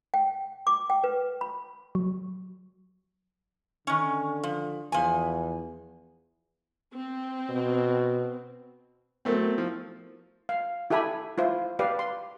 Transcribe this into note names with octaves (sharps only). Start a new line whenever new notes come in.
G5
D6
G5
B4
B5
F#3
D3 D#3 C#4
F3
E2 F3 G#5
C4
B2
F#3 A3 B3 C4 A#4
F3 E4
F5
E4 G4 A4 E5 G#5 B5
E4 F4 C5
G4 B4 D5 F5
C6